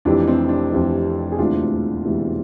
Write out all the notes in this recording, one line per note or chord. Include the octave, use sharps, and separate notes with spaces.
F1 F2 C3 E3 D4
C4
D4
F1 F2 C3 E3
G#4
E1 D2 C3 E3 D4 F4
E1 D2 C3 E3